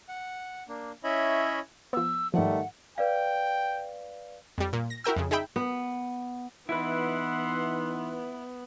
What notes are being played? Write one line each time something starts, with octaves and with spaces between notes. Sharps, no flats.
F#5
A#3 D4
C#4 E4 C#5 D#5 E5 B5
F3 B3 E6
G#2 D#3 F3 G3 A3 F#5
B4 D5 F5 G5
F2 G3
A#2
A#6
E4 F#4 A#4 G5 E6
F2 C#3
D#4 G#4 E5 G5 B5
B3
E3 B3 D#4 E4 B4 E5 F#5 C6